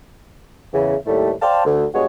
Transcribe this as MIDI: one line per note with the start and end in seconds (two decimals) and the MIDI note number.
0.73 0.95 40
0.73 0.95 49
0.73 0.95 52
1.06 1.32 39
1.06 1.32 45
1.06 1.32 55
1.06 1.32 57
1.41 1.65 72
1.41 1.65 74
1.41 1.65 77
1.41 1.65 79
1.41 1.65 81
1.65 1.85 38
1.94 2.05 43
1.94 2.05 56
1.94 2.05 59
1.94 2.05 66
1.94 2.05 73